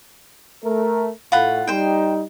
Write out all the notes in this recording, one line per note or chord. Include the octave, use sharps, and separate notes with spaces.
A3 A#4
A2 F4 F#5 B5
G3 D#4 C5 G5